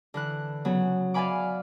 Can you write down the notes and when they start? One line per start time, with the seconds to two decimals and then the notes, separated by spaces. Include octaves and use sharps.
0.14 D3 E3 F#6
0.65 C#3 F#3 B3
1.14 D5 E5 F5 G#5 B5 D6